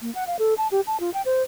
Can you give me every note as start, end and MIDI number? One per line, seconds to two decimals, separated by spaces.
0.02 0.13 58
0.15 0.26 78
0.27 0.37 77
0.39 0.54 69
0.57 0.68 81
0.71 0.81 67
0.87 0.99 81
1.00 1.12 65
1.14 1.22 79
1.25 1.42 72